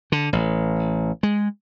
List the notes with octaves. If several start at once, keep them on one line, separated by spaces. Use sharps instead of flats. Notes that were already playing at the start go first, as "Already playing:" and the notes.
D3
A1
G#3